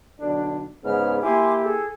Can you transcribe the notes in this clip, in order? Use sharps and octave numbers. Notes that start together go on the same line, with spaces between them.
B1 D3 D4
G#2 C#3 B3 F6
A#3 E4 G4 G#5 C6 D6
G#4 A4